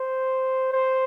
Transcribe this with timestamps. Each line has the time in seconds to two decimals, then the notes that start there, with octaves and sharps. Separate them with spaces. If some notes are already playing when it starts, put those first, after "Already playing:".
Already playing: C5
0.73 C5